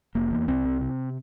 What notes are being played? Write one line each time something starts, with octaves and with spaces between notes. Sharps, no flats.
F1 A#3
E2
C2 C4
C3
C3